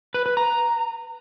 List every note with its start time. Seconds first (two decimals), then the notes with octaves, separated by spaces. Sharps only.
0.14 B4
0.26 B4
0.37 A#5